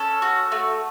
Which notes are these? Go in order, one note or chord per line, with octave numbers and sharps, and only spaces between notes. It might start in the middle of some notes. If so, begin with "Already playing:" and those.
Already playing: C#4 A4
F#4
A3